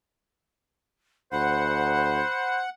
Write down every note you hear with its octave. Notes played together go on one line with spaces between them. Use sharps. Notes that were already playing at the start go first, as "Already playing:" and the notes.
D2 C5 F#5 B5